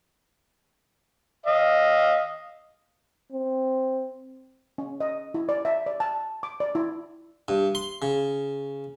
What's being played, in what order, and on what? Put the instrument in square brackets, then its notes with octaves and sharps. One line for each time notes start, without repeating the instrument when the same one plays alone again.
[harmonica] D#5 F5
[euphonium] C4
[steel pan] C#4
D#5
E4
D5
E5
D5
A5
D6
D5
E4
[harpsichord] G2
C6
C#3